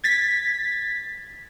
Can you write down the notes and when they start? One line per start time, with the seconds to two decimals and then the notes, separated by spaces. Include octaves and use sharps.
0.04 G#6 A6 B6